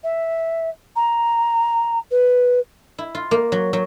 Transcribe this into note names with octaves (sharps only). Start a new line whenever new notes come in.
E5
A#5
B4
E4
F4
A#3
F#3
F#3